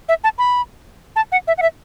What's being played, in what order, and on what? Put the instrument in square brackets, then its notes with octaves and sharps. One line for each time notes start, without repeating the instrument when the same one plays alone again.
[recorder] E5
A5
B5
A5
F#5
E5
F#5
E5